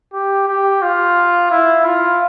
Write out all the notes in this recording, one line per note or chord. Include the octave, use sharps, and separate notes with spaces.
G4
G4
F4
E4
F4